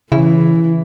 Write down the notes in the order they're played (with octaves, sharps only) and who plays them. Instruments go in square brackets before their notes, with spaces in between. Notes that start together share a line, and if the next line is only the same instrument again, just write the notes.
[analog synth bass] C#3 [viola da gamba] E3 [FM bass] E4